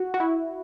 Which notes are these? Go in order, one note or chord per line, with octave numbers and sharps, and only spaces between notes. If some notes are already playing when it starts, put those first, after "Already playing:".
Already playing: F#4
F#4
E4